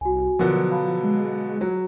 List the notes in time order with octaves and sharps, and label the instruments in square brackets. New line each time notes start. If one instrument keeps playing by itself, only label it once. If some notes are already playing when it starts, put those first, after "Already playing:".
[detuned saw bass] C2 [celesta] F#4 G#5
[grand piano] B2 D3 F#3 [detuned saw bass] F3 [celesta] A#4
[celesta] F5 A5 B5
[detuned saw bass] G#3
[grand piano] F#3